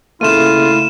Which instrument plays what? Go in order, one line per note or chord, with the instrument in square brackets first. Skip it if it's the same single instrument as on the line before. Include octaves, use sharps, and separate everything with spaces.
[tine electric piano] C#3 A3 A#3 [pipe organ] E4 [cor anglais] F4 [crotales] D#7 E7